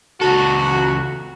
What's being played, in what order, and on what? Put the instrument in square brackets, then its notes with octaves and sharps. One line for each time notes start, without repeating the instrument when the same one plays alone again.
[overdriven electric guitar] C#2 A4 [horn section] F#4